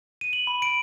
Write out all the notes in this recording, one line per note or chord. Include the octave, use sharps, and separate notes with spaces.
D#7
F#7
B5
D7